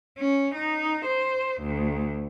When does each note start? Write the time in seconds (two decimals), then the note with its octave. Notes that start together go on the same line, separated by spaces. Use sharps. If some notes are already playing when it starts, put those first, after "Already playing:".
0.19 C#4
0.55 D#4
1.05 C5
1.61 D2